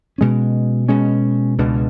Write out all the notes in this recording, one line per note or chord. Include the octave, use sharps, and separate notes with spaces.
B2 G#3 C#4
B2 G#3 C#4
C#2 B2 G#3 D4